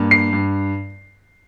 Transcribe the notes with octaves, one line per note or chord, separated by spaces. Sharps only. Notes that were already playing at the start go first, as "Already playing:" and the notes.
Already playing: G2 A#3
C7
G2